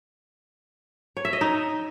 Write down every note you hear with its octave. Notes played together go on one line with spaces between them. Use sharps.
C#5
E5
D#5
D#4